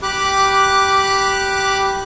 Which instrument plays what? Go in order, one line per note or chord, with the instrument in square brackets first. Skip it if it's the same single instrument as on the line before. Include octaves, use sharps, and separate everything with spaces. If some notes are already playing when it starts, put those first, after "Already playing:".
[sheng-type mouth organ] G4 B5 D6 F#6